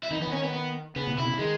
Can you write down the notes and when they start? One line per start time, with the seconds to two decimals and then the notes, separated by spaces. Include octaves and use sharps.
0.03 E4
0.11 D#3 D#4
0.20 E3 B3
0.27 D#3 C#4
0.43 B3
0.53 B3
0.96 C#3 B3
1.07 A#2
1.18 B2 E4
1.28 C#3
1.39 D#3 G#3